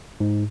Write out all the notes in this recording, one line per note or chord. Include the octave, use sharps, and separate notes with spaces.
G#2